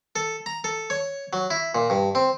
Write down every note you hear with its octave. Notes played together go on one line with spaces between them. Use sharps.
A4
A#5
A4
C#5
F#3
E4
A#2
G2
C4